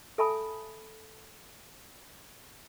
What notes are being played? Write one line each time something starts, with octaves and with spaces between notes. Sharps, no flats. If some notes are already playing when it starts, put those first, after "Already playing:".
A4 E5 G#5 A5 B5 D#6